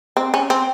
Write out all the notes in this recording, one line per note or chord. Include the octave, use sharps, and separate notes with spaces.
C4
C#4
C4